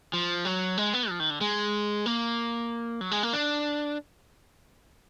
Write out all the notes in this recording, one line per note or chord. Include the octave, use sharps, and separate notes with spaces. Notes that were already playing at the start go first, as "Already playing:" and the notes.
F3
F#3
G#3
B3
F3
D#3
D3
G#3
A#3
F#3
G#3
A#3
D4